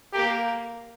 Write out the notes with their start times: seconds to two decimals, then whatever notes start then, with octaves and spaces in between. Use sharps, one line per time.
0.13 A#3 G4